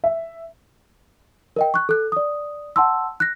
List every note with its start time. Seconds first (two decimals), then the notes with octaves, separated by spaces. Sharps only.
0.04 E5
1.56 A#4 D#5 G5
1.74 C#6 F#6
1.89 A4 F#6
2.12 D5 D#6
2.76 F#5 A5 C6 E6
3.20 F#6 A#6